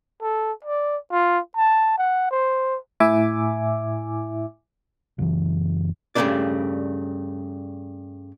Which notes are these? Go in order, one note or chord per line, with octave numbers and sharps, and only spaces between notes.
A4
D5
F4
A5
F#5
C5
A2 E4 E5 G#5 D6
F#1 E3
G2 C#3 G#3 A3 D4 D5